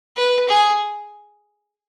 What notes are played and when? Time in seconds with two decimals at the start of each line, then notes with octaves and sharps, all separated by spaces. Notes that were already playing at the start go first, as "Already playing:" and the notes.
0.16 B4
0.49 G#4